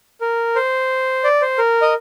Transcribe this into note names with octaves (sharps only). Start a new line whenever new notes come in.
A#4
C5
D5
C5
A#4
D#5